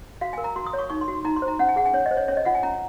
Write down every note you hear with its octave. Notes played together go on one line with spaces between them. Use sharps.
F#4 F5
A#4 G#5
A#5
F#4 C6
D#6
C#5
C#6
D#4 C#6
C6
F#4
D#4 A#5
C6
C5
A#5
C#4 F#5
G#5
G#4 F#5
G#5
C#4 C#5
D#5
C5
C#5
C#4 C#5
D#5
F4 F#5
G#5
C#4 A#5